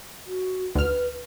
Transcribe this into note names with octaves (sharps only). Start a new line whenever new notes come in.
F#4
D2 B4 F6